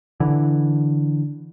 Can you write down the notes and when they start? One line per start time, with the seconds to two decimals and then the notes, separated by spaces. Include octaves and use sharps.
0.20 D3 E3